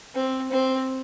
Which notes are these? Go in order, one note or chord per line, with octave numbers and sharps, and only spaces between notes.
C4
C4